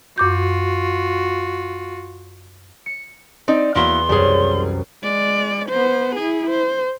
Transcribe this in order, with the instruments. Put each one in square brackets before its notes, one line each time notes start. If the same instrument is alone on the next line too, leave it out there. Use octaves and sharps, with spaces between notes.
[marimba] F#2 D6 G6 [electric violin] F4 F#4
[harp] C#7
[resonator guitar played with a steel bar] C4 D#4 D5
[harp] E2 [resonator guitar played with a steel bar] A#3 E4 F#4 [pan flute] C6
[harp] C2 F#2 [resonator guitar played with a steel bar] G3 G#4
[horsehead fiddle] G#3 D5
B3 C5
E4 G#4
C5